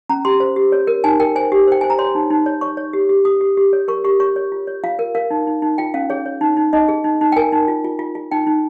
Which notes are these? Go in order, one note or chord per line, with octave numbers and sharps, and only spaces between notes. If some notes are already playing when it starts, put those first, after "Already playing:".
C#4 A#5
G4 C6
C5
G4
C#5
A#4
D#4 G#5
A#4 G5
C5 G#5
G4
C5 G5
C5 G#5
A#5
C#5 C6
D#4
D#4
C#5
C#5 C#6
C#5
G4
G4
G4 D#6
G4
G4
C#5
A#4 C#6
G4 C#6
C#5 C#6
C#5
F4
C#5
F4 F5
A#4
A#4 F5
D#4
D#4
D#4
F4 G5
C#4 F5
G#4 C#5
C#5
D#4
D#4
D#4 D#5
G#4
D#4
D#4
G5
A#4 G#5
D#4
F4
F4
F4
F4
D#4 G5
D#4